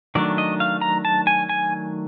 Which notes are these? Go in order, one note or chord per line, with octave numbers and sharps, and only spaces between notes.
D#3 F#3 A3 D4 D5
D#5
F5
A#5
A5
G#5
G#5